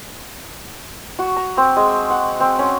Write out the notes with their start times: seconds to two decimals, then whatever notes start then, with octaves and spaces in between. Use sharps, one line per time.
1.19 F#4
1.36 A#5
1.57 C4
1.76 G#3
2.10 F#5
2.40 C4
2.59 C#4